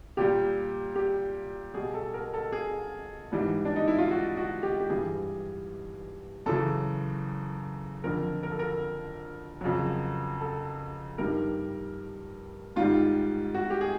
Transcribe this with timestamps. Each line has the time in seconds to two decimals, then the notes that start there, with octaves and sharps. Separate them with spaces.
0.17 A#2 G3 G4
0.96 G4
1.74 B2 G3 G#4
1.94 A4
2.14 A#4
2.34 A4
2.52 G#4
3.32 G#2 E3 G3
3.65 D4
3.76 D#4
3.88 E4
3.98 F4
4.11 F#4
4.37 F#4
4.63 G4
4.80 G4
4.90 G2 E3 G3 G#4
6.46 F#2 C#3 E3 A4
8.04 F2 D3 F3 A#4
8.43 A#4
8.51 A4
8.59 A#4
9.61 F2 C#3 F#3
10.41 A4
11.18 G2 D#3 G3 A#4
12.76 G#2 D#3 G3 F4
13.54 F#4
13.70 G4
13.81 G#4